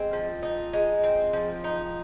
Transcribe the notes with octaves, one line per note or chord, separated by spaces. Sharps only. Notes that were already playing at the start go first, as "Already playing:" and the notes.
Already playing: G#3 C4
F3
D#4
G#3
C4
F3
D#4